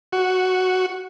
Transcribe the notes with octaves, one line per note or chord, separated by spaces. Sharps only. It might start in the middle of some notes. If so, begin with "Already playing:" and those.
F#4